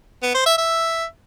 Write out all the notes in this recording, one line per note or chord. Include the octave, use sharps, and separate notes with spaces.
B3
C5
E5
E5